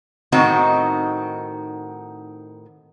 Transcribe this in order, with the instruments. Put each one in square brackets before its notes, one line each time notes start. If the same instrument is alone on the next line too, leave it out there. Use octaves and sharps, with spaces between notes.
[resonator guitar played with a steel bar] A2 D#3 C4 D#4 F#4